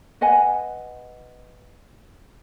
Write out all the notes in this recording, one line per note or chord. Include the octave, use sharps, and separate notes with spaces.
B4 D#5 F#5 G#5